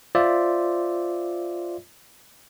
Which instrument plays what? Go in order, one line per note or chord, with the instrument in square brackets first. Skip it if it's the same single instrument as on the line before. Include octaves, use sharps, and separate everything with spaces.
[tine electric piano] F4 C5 D5 E5